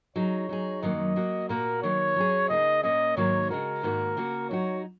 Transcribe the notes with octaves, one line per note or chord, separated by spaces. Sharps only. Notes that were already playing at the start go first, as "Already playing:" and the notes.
F#3 D#4 G#4 C#5
F#3 D#4 G#4
F#2 D#3 F#3 A#3 D#5
F#3 A#3 F#4
A#2 A#3 F#4 A#4
D#3 F#3 A#3 C#5
F#3 C#4 G#4
C#3 A#3 D#4 G#4 D#5
A#2 A#3 C#4 D#5
G#2 D#3 F#3 A#3 C#5
C#3 G#3 F#4 A#4
G#2 D#3 A#3 F#4
C#3 A#3 F#4
F#3 D#4 F#4 C#5